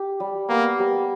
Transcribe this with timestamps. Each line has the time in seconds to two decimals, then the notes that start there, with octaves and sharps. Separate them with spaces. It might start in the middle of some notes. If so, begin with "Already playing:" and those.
Already playing: G4
0.20 G3
0.49 A#3 B3
0.79 G3